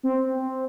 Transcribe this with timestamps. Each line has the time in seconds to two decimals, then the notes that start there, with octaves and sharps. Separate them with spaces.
0.03 C4